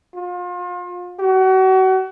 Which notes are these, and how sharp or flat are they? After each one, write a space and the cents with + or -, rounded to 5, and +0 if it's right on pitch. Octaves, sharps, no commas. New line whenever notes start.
F4 +35
F#4 +35